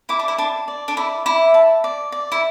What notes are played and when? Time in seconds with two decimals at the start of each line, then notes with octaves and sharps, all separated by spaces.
0.09 E4 D6
0.19 D4
0.28 E4
0.38 D4 A5
0.68 D5
0.88 D4
0.97 E4 D5
1.26 E4 D6
1.54 A5
1.84 D5
2.12 D5
2.32 E4